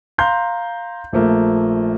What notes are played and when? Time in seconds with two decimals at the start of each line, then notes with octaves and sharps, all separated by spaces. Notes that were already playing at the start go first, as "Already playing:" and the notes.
0.18 F5 A#5 C6 G6
1.13 A#1 F3 A3 A#3